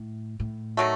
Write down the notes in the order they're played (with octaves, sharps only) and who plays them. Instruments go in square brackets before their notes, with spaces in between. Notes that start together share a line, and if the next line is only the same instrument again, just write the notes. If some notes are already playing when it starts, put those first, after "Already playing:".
Already playing: [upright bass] A2
A2
[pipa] D#3 F#3 A3